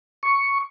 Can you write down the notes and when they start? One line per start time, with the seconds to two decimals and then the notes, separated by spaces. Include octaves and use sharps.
0.23 C#6